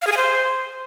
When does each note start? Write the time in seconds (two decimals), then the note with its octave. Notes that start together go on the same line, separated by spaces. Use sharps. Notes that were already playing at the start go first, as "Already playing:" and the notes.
0.02 F5
0.07 G#4
0.12 G#5
0.17 C5